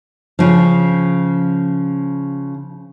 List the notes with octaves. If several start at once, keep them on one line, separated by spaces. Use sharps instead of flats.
C#3 F3